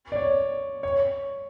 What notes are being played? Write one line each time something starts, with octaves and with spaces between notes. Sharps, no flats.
D5
C#5
C#5